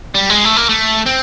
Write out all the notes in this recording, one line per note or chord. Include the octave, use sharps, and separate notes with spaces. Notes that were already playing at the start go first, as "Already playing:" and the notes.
G3
G#3
A3
A#3
A3
C4